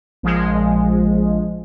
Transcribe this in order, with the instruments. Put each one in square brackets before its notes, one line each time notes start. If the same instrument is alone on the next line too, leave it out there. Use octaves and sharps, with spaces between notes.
[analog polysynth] A#1 F3 G#3